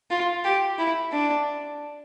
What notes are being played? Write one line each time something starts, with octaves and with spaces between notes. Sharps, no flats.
F4
G4
E4
D4